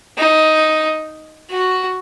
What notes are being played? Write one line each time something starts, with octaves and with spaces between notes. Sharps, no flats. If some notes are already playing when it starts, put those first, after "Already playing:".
D#4
F#4